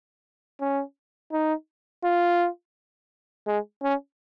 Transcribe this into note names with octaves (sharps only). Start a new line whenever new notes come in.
C#4
D#4
F4
G#3
C#4